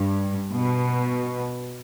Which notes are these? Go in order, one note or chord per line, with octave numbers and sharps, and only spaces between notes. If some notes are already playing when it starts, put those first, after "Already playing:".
Already playing: G2
B2